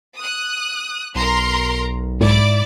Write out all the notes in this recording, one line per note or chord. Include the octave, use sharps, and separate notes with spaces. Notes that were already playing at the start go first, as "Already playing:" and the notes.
D#6 F#6
B1 A#4 A#5 C6
G#2 E4 D5